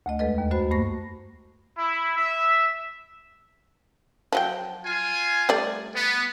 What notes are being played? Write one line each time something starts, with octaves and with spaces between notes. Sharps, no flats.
D2 A3 D#5
E2 G#3 A4 B4 D#5
D#2
F#2 F#4 C5 B5
G2 A3 A#3 C#6 A#6
E4
E5
F3 F#3 G5
F4 G#5
G3 A3 D5
B3